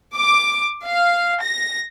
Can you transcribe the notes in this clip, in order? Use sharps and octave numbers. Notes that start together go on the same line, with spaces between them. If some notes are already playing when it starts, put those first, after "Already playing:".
D6
F5
A#6